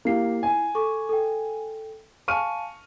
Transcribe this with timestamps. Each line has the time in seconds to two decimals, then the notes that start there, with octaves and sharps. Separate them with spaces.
0.05 A#3 E4 G4 C7
0.43 G#5
0.75 A4 C#6 D6
1.09 A4 G5
2.28 F5 G#5 A5 C#6 F6 D#7